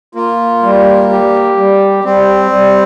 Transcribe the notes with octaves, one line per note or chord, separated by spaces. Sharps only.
A#3 F4
G3
G4
G3
G3 C4
G3